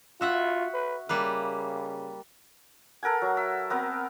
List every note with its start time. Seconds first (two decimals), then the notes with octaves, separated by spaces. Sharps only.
0.21 F4 F#4 E5 F#5
0.74 B4
1.09 C#3 G3 A#3 B4
3.03 A4 A#4 F#5 G#5
3.22 F#3
3.37 E5
3.70 B3 C4 A#4